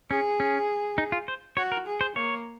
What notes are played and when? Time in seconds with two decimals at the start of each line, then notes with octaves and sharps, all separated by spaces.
0.10 C#4 G#4
0.40 C#4
0.98 D#4
1.12 F4
1.28 C5
1.57 F#4 C#5
1.72 A#4
1.87 G#4
2.01 C5
2.16 A#3 C#5